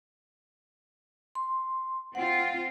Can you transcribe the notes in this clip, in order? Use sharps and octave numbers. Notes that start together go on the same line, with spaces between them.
C6
C4 F4 F#5